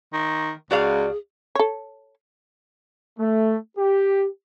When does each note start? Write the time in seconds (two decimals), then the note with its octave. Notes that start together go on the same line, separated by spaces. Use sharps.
0.13 D#3
0.71 C#2 F#4 G#4 D5 F5
1.55 A4 C#5
3.19 A3
3.78 G4